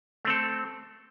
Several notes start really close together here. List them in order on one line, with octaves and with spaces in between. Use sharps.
A3 C4 A4